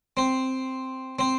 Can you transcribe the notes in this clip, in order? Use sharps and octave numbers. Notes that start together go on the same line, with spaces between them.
C4
C4